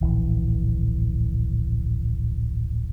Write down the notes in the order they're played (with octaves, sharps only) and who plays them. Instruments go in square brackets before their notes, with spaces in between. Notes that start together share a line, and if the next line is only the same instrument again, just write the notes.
[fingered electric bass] D1 A#1 E3